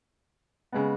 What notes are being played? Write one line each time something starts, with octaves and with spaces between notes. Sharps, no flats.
C#3 G#3 B3